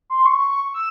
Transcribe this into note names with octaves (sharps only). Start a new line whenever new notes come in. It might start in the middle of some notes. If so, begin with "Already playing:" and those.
C6
C#6
C#6
C#6
E6